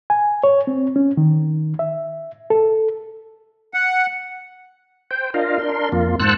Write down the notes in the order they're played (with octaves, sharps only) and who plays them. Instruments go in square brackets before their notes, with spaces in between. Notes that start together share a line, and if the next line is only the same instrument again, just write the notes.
[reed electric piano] G#5
C#5
C4
C#4
D#3
E5
A4
[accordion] F#5
[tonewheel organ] C5 G5
D4 F4 A#4 D#5 F5
D4 A#4 C6
F2 A#3 F4
G#2 C5 F#5 A5 E6 F#6